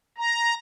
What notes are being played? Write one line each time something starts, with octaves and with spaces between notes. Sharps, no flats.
A#5